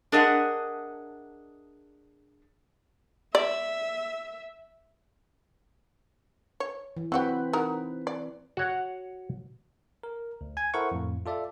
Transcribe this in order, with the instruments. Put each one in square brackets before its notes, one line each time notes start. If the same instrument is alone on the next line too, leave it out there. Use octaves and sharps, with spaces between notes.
[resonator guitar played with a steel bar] D4 G#4 A#4 D#5 E5 F#5
[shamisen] D5 [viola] E5
[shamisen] C#5
[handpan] E3
[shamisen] F#3 F#4 G4 [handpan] C4 B4
[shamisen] D#4 F#4 A#4
D5
[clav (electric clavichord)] F#4 C#5 F#5
[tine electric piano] A#4
D2
G#5 G#6
E4 A4 A#4 C5 F#5 C#6
F2 A2
F4 A4 D5 E5